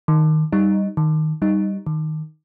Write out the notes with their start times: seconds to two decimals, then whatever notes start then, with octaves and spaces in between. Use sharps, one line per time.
0.08 D#3
0.53 G3 D#4
0.97 D#3
1.42 G3 D#4
1.87 D#3